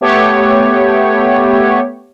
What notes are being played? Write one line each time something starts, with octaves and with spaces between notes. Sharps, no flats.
A3 B3 G4 C#5